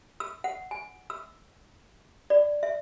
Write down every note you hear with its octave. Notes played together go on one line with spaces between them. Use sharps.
E6
F#5
G#5
E6
D5
E5